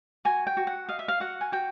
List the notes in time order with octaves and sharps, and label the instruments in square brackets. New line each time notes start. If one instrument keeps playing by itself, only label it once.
[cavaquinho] F#4 G#5
G5
F#4
F#5
D#5 F5
E5
F5
F#4 F#5
G#5
F#4 G5